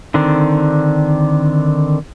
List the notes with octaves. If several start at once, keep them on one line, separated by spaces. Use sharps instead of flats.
D3 D#3 C4 D4